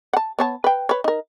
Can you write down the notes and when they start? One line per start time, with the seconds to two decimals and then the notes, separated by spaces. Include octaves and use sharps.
0.13 F#5 A5
0.39 B3 C#5 A5
0.64 B4 G5
0.89 B4 C#5
1.04 D#4 A#4